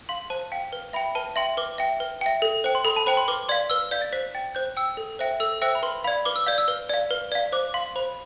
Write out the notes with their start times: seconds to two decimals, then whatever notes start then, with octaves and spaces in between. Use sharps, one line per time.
0.09 F5 C6
0.30 C5 A5
0.52 F5 G5
0.73 B4
0.93 E5 G5 B5
1.15 B4 A5
1.36 E5 G5 C6
1.57 B4 D6
1.78 E5 G5
2.00 B4
2.21 E5 G5
2.42 A4
2.64 C5 G5
2.75 C6
2.85 A4 B5
2.96 A5
3.06 C5 G5 B5
3.17 C6
3.28 B4 D6
3.49 D5 F5 C6
3.70 B4 E6
3.91 D5 F5 G6
4.02 A6
4.13 C5 B6
4.35 G5 A6
4.55 C5 G6
4.77 G5 E6
4.97 A4
5.19 C5 E5 G5
5.40 A4 E6
5.62 C5 E5 G5 E6
5.75 B5
5.83 B4 C6
6.04 D5 F5 B5
6.25 B4 D6
6.36 E6
6.46 D5 F5 G6
6.58 E6
6.68 B4
6.89 D5 F5
7.11 B4
7.32 D5 F5
7.52 C5 D6
7.74 F5 C6
7.96 C5 B5